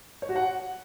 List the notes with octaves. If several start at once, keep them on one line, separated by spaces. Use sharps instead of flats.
C#5
F#4
F#5